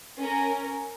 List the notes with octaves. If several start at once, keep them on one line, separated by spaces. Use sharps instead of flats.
C#4 A#4